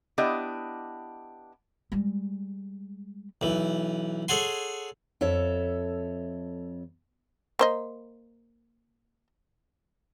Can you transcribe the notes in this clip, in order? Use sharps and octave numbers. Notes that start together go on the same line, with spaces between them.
B3 D4 E4 G4 D5 D#5
G3 G#3
B1 E3
G#4 A4 C#5 F#5 G#5 C6
F2 A4 C#5 E5
A#3 C5 D#5